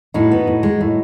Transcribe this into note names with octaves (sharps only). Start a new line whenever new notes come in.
A2 D#4 F#4
B3
A2
G#3
A2